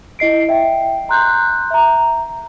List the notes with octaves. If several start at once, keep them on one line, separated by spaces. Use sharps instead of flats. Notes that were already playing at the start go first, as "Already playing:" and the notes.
E4 D#5 C7 D7
E5 G5
A#5 C6 F#6 G6
E5 A#5